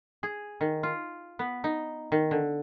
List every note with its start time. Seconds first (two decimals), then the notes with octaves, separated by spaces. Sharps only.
0.23 G#4
0.61 D#3
0.83 F4
1.39 B3
1.64 D#4
2.12 D#3
2.31 D3